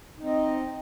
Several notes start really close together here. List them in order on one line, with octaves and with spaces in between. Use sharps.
D#4 C4 D#5